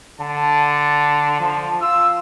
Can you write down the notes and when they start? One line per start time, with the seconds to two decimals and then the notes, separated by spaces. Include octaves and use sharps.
0.20 D3 A5
1.40 F3
1.82 F4 E6